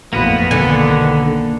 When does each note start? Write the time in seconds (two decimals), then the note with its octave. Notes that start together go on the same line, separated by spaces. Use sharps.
0.13 A1 F2 A#3 B3 F#4 B4
0.51 B1 D3 D#3 A#3 A4 G#5